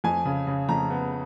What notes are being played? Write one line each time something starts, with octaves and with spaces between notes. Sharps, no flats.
F2 G#5
C#3
C#3
F2 A#5
B3